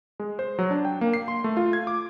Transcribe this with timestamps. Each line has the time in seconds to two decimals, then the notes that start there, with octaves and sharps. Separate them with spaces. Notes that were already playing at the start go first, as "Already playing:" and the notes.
0.20 G#3
0.39 C5
0.59 F#3
0.70 D4
0.85 G5
1.01 A#3
1.14 C7
1.28 C6
1.44 A3
1.57 F4
1.73 G#6
1.87 D6